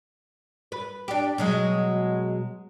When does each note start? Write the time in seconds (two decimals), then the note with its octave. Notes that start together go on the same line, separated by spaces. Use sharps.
0.72 B4
1.08 D4 G4
1.38 B2 F#3 G#3